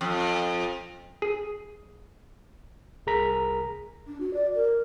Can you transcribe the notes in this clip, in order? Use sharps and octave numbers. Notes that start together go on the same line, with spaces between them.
F2
G#4
C2 G#4 A#4 A#5 B6
D4
F#4
D5
A#4